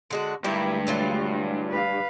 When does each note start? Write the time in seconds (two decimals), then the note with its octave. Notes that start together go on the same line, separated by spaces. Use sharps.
0.11 D3 G#3 F#4
0.44 D2 G2 D#3 G#3 E4 G4
0.87 E3 F#3 F4
1.71 B4 F5